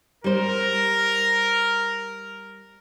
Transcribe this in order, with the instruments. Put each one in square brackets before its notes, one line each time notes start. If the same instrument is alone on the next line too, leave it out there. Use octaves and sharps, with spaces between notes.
[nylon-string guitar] G3 C5 [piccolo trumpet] A#4